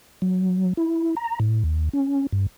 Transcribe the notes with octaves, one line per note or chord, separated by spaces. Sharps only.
F#3
E4
A#5
A2
D#2
C#4
G2